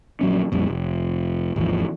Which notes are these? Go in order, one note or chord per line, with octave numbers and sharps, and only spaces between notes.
A#1 F#3 C#4
A#1 F2 G3
F1
G#1 D#2 E3 F3